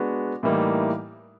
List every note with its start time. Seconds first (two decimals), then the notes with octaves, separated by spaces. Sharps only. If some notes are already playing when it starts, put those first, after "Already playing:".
Already playing: G#3 B3 D4 F#4
0.43 A2 E3 G3 A#3 D#4